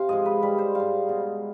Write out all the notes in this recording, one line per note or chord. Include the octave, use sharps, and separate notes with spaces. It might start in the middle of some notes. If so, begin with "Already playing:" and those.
Already playing: C3 C5 F5
G#2 F3 G#3 D#5
B4
G#2 G3 B4
C5
G#2 G3 F5
B2 G#3